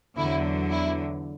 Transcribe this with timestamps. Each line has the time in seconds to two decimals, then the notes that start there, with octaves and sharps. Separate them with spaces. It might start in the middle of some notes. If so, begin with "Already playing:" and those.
0.16 E2 D3 F#3 E4
0.71 E4